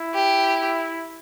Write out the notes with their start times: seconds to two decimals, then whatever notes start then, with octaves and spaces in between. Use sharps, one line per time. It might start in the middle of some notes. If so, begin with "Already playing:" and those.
Already playing: E4
0.14 G4